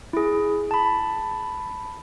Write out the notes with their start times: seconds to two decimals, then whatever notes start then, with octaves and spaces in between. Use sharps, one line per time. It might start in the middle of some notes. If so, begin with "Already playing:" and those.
0.13 E4 G#4
0.71 A5 B5